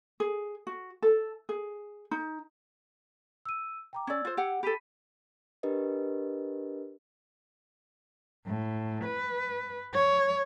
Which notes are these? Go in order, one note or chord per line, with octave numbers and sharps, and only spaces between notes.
G#4
F#4
A4
G#4
D#4
E6 D#7
G5 A#5 D6
C#4 D5 E6 G#6
F4 C5
G4 F#5
G4 A4 B5 B6 D#7
D4 G4 A#4 B4 D#5
A2
B4
C#5